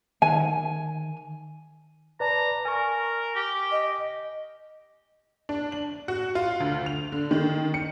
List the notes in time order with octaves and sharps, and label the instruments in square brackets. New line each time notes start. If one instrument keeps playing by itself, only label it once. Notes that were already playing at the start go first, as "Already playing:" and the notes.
[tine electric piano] D#3 [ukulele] G#5
[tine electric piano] B4 D5 A5 [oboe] A#5
[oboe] A#4 [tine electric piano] G#5 C#6
[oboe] G4
[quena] D#5
[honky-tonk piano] D4
F#7
F#4
F4
D2
F7
D3
D#3
C#7